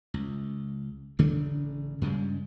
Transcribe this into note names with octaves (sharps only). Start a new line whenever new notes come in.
C#2
A1 C#3 A3 D4
G2 C#3 G3 G#3